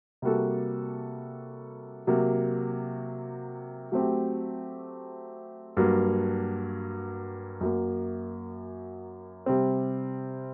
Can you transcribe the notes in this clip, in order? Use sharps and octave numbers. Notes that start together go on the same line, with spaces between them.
C3 G3 A#3 F#4 A4
C3 F#3 A#3
F#3 A3 C4 G4
G2 F#3 A#3
F#2 F#3 A#3
C3 G3 C4